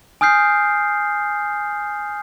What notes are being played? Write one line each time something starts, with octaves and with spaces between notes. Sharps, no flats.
G#5 D#6 F6 G6 C7